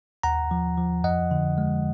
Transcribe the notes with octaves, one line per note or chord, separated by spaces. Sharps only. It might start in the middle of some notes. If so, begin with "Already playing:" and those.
D#2 F#5 A#5
F3
F3
F2 D#5 F#5
D3
G#3